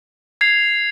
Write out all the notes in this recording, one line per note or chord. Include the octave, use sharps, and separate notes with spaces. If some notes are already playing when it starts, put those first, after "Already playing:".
G#6 C7 F7